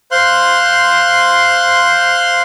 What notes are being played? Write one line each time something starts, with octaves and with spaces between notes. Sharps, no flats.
C5 F5 C6 F#6